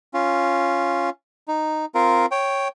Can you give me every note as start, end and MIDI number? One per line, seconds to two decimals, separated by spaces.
0.14 1.10 61
0.14 1.10 65
1.48 1.85 63
1.95 2.26 60
1.95 2.26 65
1.95 2.26 70
2.31 2.68 73
2.31 2.68 79